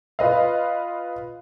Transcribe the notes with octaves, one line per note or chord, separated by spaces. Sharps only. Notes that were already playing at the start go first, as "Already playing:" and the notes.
F4 B4 D#5 F5